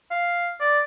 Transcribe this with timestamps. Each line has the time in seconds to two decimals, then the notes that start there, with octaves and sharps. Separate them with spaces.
0.11 F5
0.60 D5